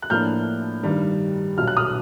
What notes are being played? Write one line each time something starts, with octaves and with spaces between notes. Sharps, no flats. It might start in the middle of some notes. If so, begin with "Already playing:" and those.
F#6
A2 F3 A#3 D4 F6 G6
G2 D#3 G3
B1 A#2 F#3 F6
F#6
D#6 F6